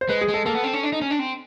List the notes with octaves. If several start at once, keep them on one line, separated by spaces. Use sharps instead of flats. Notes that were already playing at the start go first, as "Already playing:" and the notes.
C5
G#3 B4
G#4
G#3
A4
A#3 A4
B3
C4
C#4
D4
D#4
C#4
D4
C4